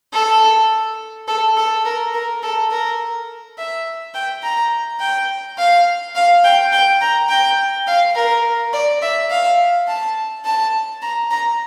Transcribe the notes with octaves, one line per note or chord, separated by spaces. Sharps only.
A4
A4
A4
A#4
A#4
A4
A#4
E5
G5
A#5
G5
F5
F5
G5
G5
A#5
G5
F5
A#4
D5
E5
F5
A5
A5
A#5
A#5